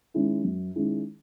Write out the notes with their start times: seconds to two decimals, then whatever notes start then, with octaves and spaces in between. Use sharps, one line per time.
0.14 D#3 G#3 C#4 E4
0.45 F#2
0.75 D#3 G#3 C#4 E4